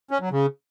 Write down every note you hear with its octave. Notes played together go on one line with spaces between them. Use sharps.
C#4
F#3
C#3